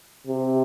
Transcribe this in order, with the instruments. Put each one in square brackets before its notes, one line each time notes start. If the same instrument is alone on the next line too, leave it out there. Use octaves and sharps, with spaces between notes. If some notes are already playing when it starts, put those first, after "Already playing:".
[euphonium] C3